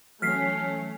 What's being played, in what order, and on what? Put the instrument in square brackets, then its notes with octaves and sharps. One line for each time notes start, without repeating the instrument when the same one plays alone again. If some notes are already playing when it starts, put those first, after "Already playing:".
[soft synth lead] E3 [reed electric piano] F#3 [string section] A3 C#4 [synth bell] F6 B6 C7